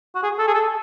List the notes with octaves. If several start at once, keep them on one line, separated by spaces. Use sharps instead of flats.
F#4
G#4
A4
G#4
A4